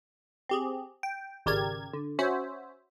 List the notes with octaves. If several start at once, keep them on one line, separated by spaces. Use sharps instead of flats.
C4 G4 G#4
G5
G#1 C#3 G4 A#4 D5 G#6
D3
C#4 F#4 C5 C#5 E5